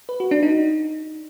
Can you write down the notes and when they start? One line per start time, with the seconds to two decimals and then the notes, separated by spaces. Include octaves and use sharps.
0.09 B4
0.20 F#4
0.31 D4
0.43 D#4